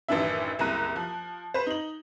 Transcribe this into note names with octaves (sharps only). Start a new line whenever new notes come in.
A1 F#2 D#3 E3 D4 E5
F#1 C2 E4 A#5 F#6 D#7
F3
B4 C5
D#4 F#7